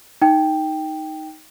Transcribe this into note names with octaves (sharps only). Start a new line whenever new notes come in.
D#4 G5